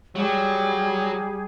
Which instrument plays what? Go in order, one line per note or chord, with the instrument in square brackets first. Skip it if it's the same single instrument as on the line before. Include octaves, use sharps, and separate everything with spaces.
[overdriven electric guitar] F#3 [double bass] G3 [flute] G#4